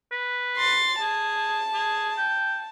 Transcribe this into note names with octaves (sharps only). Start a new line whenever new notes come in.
B4
C6 A6
G#4 A5
G#4
G5